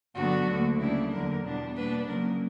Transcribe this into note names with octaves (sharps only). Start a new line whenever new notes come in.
G2 D3 F#3 B3 D4 F#4
D2 D3 A#3
C#3 G3 A#3 D4 E4
E2 D3 F#3 A#3 A#4
E2 B2 G3 B3 D4
B2 G3 A#3 D4 B4
C#3 F#3 A#3 A#4